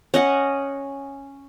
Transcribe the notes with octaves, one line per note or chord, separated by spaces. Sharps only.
C#4 D#5 F#5